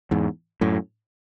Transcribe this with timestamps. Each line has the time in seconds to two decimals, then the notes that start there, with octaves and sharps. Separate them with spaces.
0.11 E2 G#2
0.61 F#2 A2